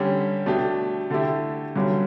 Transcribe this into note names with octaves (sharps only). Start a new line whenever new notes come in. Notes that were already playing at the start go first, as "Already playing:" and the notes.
Already playing: D3 G3 C#4 G4
B2 A3 D4 G4
D3 A3 E4 G4
G2 D3 F#3 C#4 G4